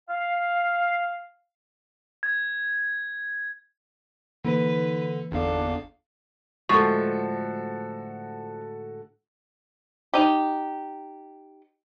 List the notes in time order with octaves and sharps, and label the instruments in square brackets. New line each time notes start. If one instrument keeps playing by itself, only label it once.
[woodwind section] F5
[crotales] G#6
[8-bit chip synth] D3 [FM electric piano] E3 A#3 D#4 [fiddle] B4
[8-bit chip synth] G1 E2 F5 [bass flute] D4 [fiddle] A4
[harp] A2 D3 G#3 [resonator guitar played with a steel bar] F3 [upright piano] F#4 A4 [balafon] C#6
[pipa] D#4 G4